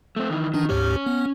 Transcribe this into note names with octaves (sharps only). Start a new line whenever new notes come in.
A3 C4
D#3 E3
D#3 E3 D4 D#4
D2 G#2 C#4 G4 C#5
B3